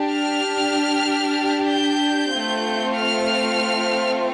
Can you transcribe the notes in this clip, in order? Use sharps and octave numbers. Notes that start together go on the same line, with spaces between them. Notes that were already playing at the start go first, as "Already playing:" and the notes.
Already playing: D4 G4
F6
G6
A3 C4 F4
F6